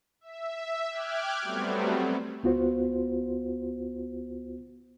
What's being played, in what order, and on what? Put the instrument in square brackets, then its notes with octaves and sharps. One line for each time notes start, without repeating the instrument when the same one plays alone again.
[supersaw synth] E5
G5 D6 F6 F#6 G#6
F#3 G3 A3 B3 C4
[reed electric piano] C#2 B3 F4 F#4 C5